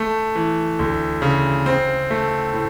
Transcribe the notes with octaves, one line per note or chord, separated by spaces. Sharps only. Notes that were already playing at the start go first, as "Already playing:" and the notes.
Already playing: A3
E3
D2
C#3
C4
A3
A2